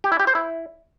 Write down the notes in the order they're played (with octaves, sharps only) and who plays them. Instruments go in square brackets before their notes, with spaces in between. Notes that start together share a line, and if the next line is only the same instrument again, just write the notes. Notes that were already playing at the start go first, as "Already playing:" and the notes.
[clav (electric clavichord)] G4
E4
G4
C5
E4